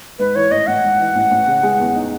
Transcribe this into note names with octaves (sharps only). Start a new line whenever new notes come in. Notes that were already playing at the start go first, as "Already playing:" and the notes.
G#2 B4
E3 C#5
A1 D#5
A1 F#5
G#2
E3
A1
A1
C#3
G#3
E2
D#4